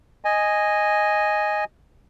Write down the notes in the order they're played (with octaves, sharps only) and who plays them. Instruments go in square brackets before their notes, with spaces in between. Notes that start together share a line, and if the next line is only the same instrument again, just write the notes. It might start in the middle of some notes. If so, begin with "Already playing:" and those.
[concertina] D#5 G#5